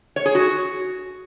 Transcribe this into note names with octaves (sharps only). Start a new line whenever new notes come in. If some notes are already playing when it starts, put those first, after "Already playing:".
C#5
G#4
F#4